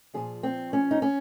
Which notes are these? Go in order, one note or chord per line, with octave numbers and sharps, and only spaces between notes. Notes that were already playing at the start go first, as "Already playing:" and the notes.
A#2 F3 G#4
C4
C#4
D#4
C#4